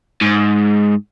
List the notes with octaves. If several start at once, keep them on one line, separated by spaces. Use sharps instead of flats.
G#2